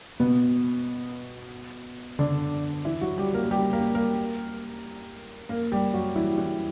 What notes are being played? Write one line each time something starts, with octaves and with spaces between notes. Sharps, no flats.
B2 B3
D3 D4
E3 E4
F#3 F#4
G3 G4
A#3 A#4
G3 G4
A#3 A#4
A#3 A#4
A#3 A#4
G3 G4
F#3 F#4
E3 E4
E3 E4